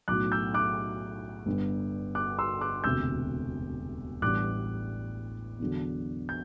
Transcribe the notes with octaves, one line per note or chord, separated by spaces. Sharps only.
B1 A2 F#3 A3 D6 F#6
E6 G6
D6 F#6
G1 G2 D3
D6 F#6
C6 E6
D6 F#6
E1 D2 C3 E6 G6
A1 A2 G3 B3 D4 D6 F#6
E2 D3 F#3
G6